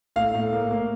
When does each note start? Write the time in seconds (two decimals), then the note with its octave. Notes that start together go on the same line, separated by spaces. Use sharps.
0.16 A2 F5
0.35 A2
0.53 A#3
0.71 A#3